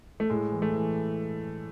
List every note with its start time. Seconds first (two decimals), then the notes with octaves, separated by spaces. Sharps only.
0.20 A3
0.30 A2 G#3
0.52 E3
0.62 A3
0.74 E3